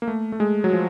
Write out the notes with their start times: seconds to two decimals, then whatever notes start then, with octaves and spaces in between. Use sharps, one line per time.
0.02 A#3
0.08 A3
0.32 A3
0.40 G#3
0.64 F#3
0.73 F3